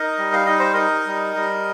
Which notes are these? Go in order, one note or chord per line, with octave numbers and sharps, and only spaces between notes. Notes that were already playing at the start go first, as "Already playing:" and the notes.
Already playing: D#4 A#4 D#5
G3
F5
D#4 D#5
C5
D#4 A#4 D#5
G3
G3